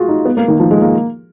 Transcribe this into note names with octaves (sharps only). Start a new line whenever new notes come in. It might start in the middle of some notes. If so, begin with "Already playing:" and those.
Already playing: F4 F#4 G#4
D#4
B3
A#3
D#3
F3
G#3
A#3